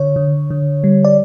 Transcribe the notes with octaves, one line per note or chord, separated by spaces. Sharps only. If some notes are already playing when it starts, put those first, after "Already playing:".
Already playing: D3 C#5
D3
D3
G3
D5